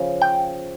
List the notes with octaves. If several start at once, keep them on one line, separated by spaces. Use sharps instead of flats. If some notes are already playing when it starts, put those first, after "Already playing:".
Already playing: C#3 F3 C#4
G5